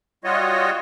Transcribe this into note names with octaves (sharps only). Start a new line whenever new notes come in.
G3 F4 F#4 C#5 D#5